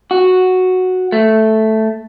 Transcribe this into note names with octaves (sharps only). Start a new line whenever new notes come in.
F#4
A3